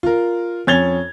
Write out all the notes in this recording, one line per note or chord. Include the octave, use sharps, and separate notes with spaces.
F4 A#4
F2 C#4 G#6 A6 F7 G7